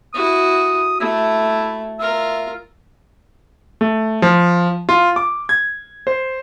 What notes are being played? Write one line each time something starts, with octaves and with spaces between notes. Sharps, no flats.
E4 F#4 D#6
A3 E4
F4 A#4 E5
A3
F3
F4
D6
G#6
C5